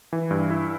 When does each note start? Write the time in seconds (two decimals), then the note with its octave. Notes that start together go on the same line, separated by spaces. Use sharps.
0.13 E3
0.31 G2
0.50 E4